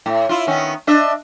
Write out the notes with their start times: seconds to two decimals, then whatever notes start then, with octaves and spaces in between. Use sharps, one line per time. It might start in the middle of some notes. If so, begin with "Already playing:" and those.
0.06 A2
0.29 E4 F4
0.47 D#3 B3 C#4
0.87 D4 D#5 E5